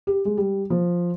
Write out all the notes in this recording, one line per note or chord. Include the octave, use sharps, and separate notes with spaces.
G4
G#3
G3
F3